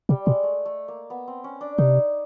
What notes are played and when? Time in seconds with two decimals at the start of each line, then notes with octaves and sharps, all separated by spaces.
0.09 C3 G3
0.26 B2 G#3
0.43 A3
0.66 A3
0.88 A#3
1.10 B3
1.28 C4
1.44 C#4
1.61 D4
1.78 C3 D#4